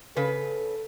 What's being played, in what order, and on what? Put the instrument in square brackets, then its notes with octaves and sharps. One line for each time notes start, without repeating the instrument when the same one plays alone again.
[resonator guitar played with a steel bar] C#3 B4 [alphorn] A4